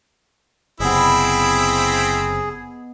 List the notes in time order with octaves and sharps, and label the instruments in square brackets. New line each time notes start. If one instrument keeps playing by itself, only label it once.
[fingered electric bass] F#1 C3 [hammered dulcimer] B3 D#5 [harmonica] C4 E4 [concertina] G#4